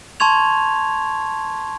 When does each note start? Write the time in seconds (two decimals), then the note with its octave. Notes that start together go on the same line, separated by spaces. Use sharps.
0.20 A5 C6 C#6 G#6 F7